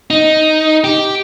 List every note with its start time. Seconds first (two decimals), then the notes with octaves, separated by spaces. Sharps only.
0.10 D#4
0.84 G4